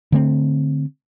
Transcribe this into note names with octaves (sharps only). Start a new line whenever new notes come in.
D3 A3 C4